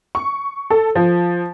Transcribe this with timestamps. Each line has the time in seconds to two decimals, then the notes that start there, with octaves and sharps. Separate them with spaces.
0.15 C#6
0.70 A4
0.95 F3